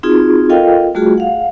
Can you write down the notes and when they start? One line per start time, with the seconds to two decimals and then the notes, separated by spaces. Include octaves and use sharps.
0.03 C4 D#4 F4 F#4 G#4
0.49 F4 A4 A#4 D#5 F5 G5
0.95 G3 A3 F4 F#4 G#4
1.18 F5 F#5